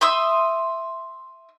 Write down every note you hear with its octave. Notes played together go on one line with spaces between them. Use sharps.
E5 C6 D#6 E6